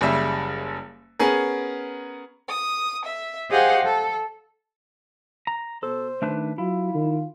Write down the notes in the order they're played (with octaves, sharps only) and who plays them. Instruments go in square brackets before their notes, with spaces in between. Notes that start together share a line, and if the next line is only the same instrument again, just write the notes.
[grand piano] F#1 C#3 G3 E5
B3 C#4 G#4 A#4
[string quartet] D#6
E5
G4 G#4 C5 D#5 F5 F#5
A4
[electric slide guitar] A#5
[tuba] B2 [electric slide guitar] A4 [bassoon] C5
[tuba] D#3 [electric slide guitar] A3 D4 B4
[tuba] F#3 [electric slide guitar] E4 [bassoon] F4
[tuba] D#3